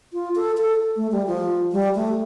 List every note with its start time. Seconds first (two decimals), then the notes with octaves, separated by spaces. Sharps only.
0.13 F4
0.36 A4
0.58 A4
0.96 A3
1.11 G3
1.27 F3
1.72 G3
1.95 A3